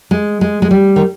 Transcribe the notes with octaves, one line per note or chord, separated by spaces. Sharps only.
G#3
G#3
G#3
G3
D#3